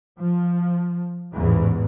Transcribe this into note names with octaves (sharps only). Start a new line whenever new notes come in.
F3
A1 E2 G#2